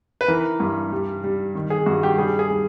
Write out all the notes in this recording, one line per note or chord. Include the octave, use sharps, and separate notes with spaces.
B4
E3 A#4
G2
G3
G3
D#3
G#4
G2 F#4
G4
G3 G#4
G#4
G3